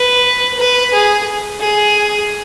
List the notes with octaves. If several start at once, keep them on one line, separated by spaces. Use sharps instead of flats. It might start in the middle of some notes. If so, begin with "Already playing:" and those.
Already playing: B4
B4
G#4
G#4